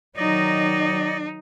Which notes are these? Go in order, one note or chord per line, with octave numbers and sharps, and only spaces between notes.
D#3 F#3 D#4 D5 D#5